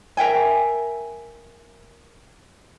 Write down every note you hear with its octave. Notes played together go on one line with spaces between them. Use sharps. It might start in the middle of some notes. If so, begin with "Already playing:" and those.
A#4 E5 G5 G#5